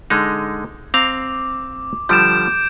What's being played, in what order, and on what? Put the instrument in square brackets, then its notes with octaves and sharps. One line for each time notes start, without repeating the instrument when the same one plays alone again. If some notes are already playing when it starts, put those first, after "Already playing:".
[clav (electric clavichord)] D3 G#3 D#4
[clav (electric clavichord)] C4 F5 A#5 [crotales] D6
[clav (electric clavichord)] D3 F3 G3 [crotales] G6 D7 E7